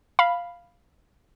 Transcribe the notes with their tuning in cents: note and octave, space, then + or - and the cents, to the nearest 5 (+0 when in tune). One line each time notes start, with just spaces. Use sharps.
F5 +0 B5 +0